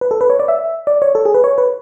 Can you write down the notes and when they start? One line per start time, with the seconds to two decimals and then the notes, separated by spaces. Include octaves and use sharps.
0.01 B4
0.11 A4
0.21 B4
0.30 C#5
0.40 D5
0.48 E5
0.87 D5
1.02 C#5
1.15 A4
1.25 G#4
1.34 B4
1.44 C#5
1.58 B4